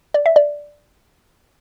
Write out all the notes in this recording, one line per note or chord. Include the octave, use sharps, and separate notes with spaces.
D5
E5
D5